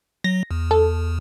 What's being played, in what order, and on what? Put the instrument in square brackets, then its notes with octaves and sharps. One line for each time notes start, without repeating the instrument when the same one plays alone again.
[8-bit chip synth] F#3 [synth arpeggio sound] A#6
[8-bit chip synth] E2
[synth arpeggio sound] A4